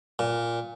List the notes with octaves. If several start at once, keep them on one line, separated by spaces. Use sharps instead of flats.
A#2